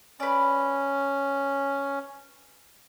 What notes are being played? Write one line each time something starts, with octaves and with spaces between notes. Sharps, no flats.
C#4 B4 D5